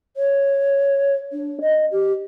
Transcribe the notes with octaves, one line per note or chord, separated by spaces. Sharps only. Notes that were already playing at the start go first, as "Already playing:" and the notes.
C#5
D4
D#5
G4